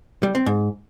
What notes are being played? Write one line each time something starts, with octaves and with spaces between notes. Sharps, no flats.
G3
C4
G#2